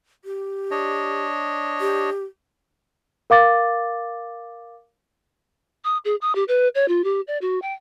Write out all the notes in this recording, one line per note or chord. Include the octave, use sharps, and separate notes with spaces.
G4
D4 C#5 D#5
G4
A#4 F5 D6 A6
D#6
G#4
D#6
G4
B4
C#5
F4
G4
D5
F#4
G5